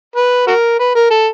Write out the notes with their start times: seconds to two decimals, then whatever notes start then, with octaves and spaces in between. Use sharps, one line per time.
0.16 B4
0.47 F#4 A#4
0.79 B4
0.95 A#4
1.10 A4